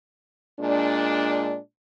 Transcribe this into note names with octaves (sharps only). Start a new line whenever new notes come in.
A#2 G#3 D4